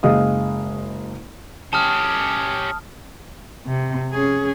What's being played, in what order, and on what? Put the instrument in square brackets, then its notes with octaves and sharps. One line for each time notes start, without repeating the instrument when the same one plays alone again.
[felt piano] F#1 G#3 D#5 F5 D#6
[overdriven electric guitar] C#4 G4 [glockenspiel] A5 D#6 F6
[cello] C3
C#4 G#4